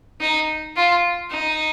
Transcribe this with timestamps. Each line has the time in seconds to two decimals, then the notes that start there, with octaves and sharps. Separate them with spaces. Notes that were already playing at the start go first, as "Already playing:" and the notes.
0.21 D#4
0.77 F4
1.31 D#4